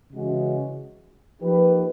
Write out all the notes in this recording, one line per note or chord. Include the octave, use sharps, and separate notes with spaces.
C#3 E3 G#3 C#4 F#4
F3 A#3 D#4 G4 B4